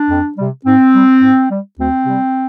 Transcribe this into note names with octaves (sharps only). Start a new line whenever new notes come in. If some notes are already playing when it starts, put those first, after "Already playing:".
Already playing: D4
F2
C3 G3
G#2 C4
G3
G#2
G3
D2 C4
C3 G3